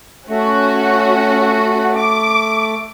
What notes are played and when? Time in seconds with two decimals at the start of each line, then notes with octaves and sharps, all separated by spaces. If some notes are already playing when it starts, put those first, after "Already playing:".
0.29 A3 C#4 F#4
1.96 D6